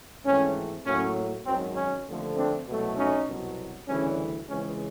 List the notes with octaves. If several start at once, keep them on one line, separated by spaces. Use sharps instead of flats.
G#1 G#2 E3 A3 C4 C#4
A2 F#3 A#3 C#4
G#1 F#2 D#3 F#3 C4
C#4
D#2 D3 F3 A3 C4
C4 D4
C2 B2 F#3 A3
C#4 D#4
C2 B2 F#3 B3
D2 C#3 E3 G3 C#4
C#2 C#3 E3 G#3 C4 C#4